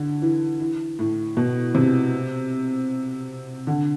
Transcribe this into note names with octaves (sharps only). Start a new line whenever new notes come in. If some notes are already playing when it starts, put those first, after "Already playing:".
Already playing: D3
E3
E3
A2
B2
C3
D3